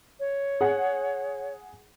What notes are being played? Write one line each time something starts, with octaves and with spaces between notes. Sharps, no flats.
C#5
G#4 F#5